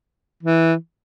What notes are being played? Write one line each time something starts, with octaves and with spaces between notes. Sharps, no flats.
E3